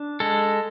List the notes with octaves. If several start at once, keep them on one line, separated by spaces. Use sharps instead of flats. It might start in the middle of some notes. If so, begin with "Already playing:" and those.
Already playing: D4
G#3 A4